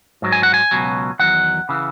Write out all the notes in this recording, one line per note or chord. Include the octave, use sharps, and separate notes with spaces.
G#2 F#3
G#5
F#5
G#5
C#2 B2 F#3
E2 D#3 F#3 F#5
C#3 E3